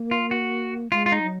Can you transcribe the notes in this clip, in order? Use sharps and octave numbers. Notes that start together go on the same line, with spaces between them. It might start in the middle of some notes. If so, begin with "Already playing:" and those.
Already playing: A#3
F4
F#4
G#3 F4
F4
D#4
F#3